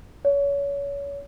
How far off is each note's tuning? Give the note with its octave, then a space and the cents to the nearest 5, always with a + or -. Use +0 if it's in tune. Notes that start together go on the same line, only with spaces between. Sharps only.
C#5 +30